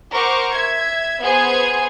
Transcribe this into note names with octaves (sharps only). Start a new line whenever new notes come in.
A#4 C5 F#5 C#6 D6
E5 G#6
B3 G#4 C5 G#5 G#6